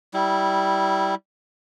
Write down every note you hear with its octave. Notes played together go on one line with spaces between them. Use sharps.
G3 E4